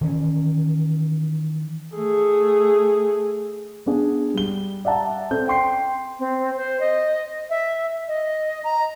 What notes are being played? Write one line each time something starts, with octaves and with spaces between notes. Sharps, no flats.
D#3 E3 C#4
A3 G#4
B3 D4 G#4
G3 G7
D5 E5 F#5 A5 A#5
C4 A4 G6
G5 C6 C7
C4
C5
D#5
E5
D#5
A#5